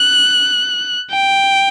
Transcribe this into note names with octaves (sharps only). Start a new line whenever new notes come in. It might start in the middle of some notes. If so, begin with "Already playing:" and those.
Already playing: F#6
G5